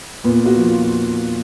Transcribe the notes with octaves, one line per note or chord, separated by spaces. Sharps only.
A#2 B3
F#4
F3
F4